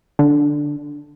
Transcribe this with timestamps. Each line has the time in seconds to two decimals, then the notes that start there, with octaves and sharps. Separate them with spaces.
0.19 D3